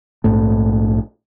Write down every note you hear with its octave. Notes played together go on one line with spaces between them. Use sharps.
A#1 G#2 A3